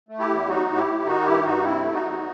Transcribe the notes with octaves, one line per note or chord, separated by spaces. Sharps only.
A3
E4 G4
E2
F#3 D#4 F#4
A2
E4 G4
A2
D#3 D#4 F#4
G2 E4 G4
G2 D#4 F#4
C3 C4 E4
A3
D#4 F#4
E2